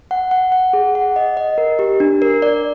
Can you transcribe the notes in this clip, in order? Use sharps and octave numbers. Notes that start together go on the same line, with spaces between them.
F#5
F#5
F#5
G#4
F#5
D#5
D#5
A#4
G4
D4
A#4
D5